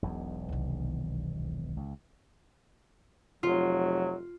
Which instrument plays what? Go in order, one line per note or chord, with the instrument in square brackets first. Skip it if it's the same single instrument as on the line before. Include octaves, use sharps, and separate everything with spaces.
[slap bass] E1 B1 E2
[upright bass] C2 D#3
[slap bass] C#2
[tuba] F1 [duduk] F#3 [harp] F4